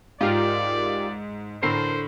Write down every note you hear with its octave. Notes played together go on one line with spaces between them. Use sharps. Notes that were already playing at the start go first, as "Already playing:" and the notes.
G#2 F4 G4 A#4 D5
A2 D3 A4 A#4 C5 C7